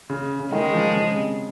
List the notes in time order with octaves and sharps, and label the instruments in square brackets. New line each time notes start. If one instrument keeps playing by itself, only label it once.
[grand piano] C#3
C#3
[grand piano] D#3 [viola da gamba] G#3
[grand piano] F3
C#3
C3